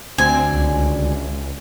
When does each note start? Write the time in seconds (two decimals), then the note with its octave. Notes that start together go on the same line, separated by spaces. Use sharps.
0.18 D2 C4 D4 G#5
0.52 C#2